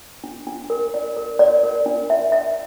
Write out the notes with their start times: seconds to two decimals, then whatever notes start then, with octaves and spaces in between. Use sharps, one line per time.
0.24 D4
0.47 D4
0.70 A#4
0.94 D5
1.17 A#4
1.39 D5
1.63 A#4
1.86 D4
2.10 E5
2.32 E5